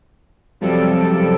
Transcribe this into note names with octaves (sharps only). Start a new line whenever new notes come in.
F#2 C3 F3 G3 A4 D7